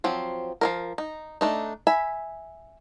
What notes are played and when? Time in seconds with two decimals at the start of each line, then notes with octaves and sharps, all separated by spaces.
0.04 F3 F#3 C4
0.61 F3 F#3 A#4
0.98 D#4
1.41 A3 D4 D#4
1.87 E5 G#5 B5